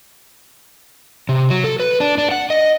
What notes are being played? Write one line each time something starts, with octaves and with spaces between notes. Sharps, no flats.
C3
F#3
A4
B4
D4
D4
F#5
D#5